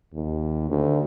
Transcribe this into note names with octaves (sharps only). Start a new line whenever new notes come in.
D#2
D2